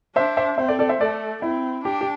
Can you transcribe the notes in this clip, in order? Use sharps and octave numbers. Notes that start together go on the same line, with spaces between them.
D4 C5 E5
C5 E5
C4 C5 E5
A4 D5
A4 D5
C5 E5
A3 A4 D5
C4 E4
D4 G4
G4